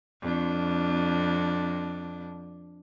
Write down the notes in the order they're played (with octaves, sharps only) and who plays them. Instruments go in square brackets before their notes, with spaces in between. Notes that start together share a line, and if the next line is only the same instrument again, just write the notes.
[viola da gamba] F2 D4